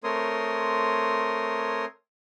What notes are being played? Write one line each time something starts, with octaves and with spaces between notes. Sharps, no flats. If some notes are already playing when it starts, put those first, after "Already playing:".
A3 C4 A#4 C#5 C6 D#6